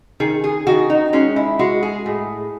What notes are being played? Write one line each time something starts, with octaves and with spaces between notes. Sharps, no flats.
D#3 G#4
G#4
D#3 F#4
D#4
G#3 C#4
E4
G#3 F#4
G#4
A2